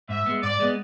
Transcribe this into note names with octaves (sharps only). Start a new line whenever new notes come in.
G#2 E5
G#3 B3
G#2 D5
G#3 B3